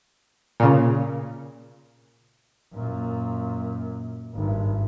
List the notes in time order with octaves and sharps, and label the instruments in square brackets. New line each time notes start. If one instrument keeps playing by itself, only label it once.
[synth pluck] A#2 C#3
[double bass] F#2 A#2
G#1 G2